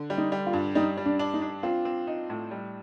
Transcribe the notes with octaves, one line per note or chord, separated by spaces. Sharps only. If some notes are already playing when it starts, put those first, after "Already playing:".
Already playing: D3
G3
D#4
G3
F4
G2
G3 D#4
G3
D4
D4
D#4
D4
C4 F4
C4
D#4
A2
G3